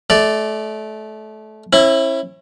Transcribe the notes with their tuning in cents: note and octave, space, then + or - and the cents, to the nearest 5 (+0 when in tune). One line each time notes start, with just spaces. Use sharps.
A3 -25 D5 +0
C#4 -45 E4 +0